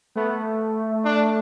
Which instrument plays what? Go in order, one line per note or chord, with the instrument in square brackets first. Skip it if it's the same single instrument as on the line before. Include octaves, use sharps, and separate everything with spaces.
[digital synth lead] A3 [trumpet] B3
[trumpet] D4